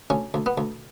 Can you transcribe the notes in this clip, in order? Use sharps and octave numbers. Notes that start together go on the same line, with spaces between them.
D2 C#4
D2
B3
D2